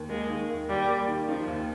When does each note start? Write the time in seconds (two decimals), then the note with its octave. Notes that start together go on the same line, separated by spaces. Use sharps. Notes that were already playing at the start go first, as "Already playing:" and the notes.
Already playing: D#2
0.09 G#3 A#3
0.30 D#3
0.49 D#2
0.69 D#2 G3
0.88 A#3
1.08 D#3
1.28 F3 D#4
1.48 D#2